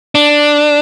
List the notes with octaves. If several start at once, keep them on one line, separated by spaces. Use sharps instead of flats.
D4